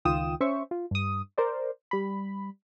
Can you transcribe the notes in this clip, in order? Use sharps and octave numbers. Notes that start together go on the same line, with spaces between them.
C#2 D#3 F4 G5 D#6 E7
C#4 C5 E5 C#6
F4
G2 D#6
A#4 C5 D5
G3 B5